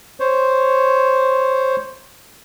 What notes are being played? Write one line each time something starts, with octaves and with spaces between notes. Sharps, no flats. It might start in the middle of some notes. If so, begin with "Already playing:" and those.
C5 C#5